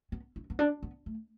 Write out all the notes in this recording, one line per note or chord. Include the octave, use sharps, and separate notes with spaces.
B3
E4
B3
D4
B3
A3